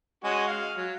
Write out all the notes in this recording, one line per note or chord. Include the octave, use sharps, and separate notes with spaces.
G#3 C#4 F#4
F5
F#3